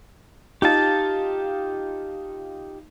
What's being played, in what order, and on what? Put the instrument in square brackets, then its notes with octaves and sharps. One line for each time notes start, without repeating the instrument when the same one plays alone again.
[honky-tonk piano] D#4 F4 [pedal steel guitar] G4 A5